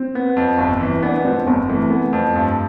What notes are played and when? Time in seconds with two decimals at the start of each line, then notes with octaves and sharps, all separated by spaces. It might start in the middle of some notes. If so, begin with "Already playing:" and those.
Already playing: C4
0.15 B3
0.36 F2
0.58 G1
0.81 E3
1.03 B3 D4
1.19 D4
1.25 F2 C4
1.46 G1 B3
1.69 E3 A3
1.89 A3 B3
2.13 F2
2.36 G2